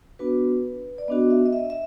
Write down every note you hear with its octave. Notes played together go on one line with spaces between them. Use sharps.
B3 D4 F#4 B4
D5
B3 D4 F#4 D#5
E5
D#5
E5
E5